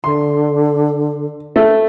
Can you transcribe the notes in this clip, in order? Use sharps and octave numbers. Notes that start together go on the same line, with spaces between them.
D3 C6
A3